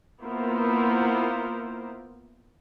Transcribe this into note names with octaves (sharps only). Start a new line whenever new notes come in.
A#3 B3 E4 F4 A#4 C5